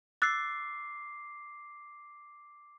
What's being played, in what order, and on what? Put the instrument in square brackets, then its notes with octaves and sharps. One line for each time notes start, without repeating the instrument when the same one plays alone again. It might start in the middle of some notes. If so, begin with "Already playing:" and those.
[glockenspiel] D6 C7 [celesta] E6 F#6 A6